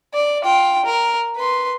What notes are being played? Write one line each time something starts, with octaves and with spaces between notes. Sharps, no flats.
D5
F4 G5
A#4
B4 C6